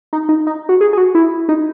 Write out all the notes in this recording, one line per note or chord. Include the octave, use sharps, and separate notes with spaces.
D#4
D#4
D#4
F#4
G#4
G#4
F#4
E4
D#4